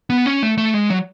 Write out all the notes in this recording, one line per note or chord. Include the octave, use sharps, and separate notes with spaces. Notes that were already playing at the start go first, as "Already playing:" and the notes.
B3
C#4
A3
A3
G#3
F#3